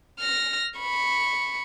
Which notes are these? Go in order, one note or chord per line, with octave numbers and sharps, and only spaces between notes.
F6 A#6
B5 C#6